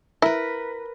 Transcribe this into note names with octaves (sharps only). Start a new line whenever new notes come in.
E4 A#4 B4